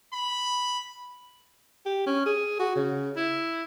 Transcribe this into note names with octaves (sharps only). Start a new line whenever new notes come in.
B5
G4
C#4
G#4
F#4
C#3
E4